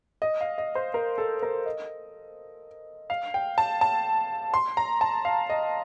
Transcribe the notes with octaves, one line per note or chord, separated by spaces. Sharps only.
D#5
F5
D#5
C5
A#4
A4
A#4
D#5
F5
G5
A5
A5
C6
A#5
A5
F5
D#5